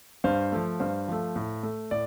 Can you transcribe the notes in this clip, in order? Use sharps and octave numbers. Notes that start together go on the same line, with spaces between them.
G2 C5 F5
F3 A3
G2 C5 F5
F3 A3
A2
A3
A2 D5